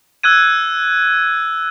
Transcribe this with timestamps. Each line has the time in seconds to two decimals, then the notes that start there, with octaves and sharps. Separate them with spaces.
0.23 E6 F#6 G#6 D#7